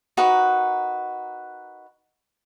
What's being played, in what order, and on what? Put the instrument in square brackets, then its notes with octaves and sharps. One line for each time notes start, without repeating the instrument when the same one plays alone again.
[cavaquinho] D#4 F#4 A#4 B4